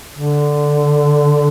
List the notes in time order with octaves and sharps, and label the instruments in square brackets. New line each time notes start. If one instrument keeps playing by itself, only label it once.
[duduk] D3